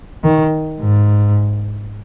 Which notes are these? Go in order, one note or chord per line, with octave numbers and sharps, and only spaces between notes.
D#3
G#2